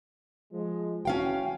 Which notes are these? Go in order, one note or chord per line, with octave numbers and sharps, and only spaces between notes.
F3 G#3
E3 C#4 F#4 F5 G5